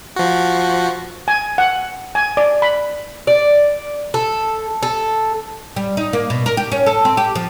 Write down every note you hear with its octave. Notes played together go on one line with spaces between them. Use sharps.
F3 F#4
G#5
F#5
G#5
D5
B5
D5
A4
A4
G3
D#4
A#3
B2
A#4
G4
C#4
A4
C4
G4
F3